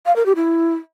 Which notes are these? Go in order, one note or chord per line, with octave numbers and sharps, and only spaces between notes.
F5
A#4
G4
E4